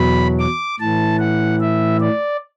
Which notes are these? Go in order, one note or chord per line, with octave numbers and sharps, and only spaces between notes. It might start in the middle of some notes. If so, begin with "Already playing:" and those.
Already playing: E2 B2 F#3 B5
D6
A2 E3 A5
F#5
E5
D5